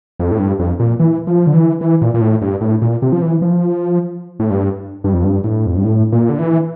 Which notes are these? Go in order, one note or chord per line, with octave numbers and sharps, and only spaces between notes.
F2
A2
G2
F2
A#2
E3
F3
D3
E3
E3
A#2
A#2
A2
G2
A2
A#2
C3
F3
E3
F3
A2
G2
G2
F2
G2
A2
F2
G2
A2
A#2
D3
E3